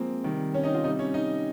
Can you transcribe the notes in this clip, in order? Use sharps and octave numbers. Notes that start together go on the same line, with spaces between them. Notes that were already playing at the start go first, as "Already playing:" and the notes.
Already playing: F3 G#3 A#3 C4
C3 D#3 G3
C#4 C#5
D#4 D#5
F4 F5
C3 G3 D#4 D#5
C#4 C#5
D#4 D#5